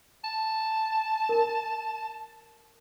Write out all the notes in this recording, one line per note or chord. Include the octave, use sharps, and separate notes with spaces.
A5
A#4